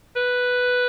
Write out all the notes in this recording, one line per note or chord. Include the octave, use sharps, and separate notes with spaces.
B4